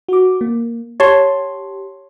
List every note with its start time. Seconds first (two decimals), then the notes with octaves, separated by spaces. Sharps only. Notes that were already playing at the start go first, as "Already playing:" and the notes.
0.08 F#4 D6
0.41 A#3
1.00 G4 C#5 A5 C6